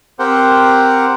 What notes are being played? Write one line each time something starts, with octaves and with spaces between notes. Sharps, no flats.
C4 G4 A#4 C5 F#5 G5